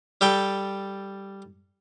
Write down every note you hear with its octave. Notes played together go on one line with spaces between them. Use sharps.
G3 A4 G5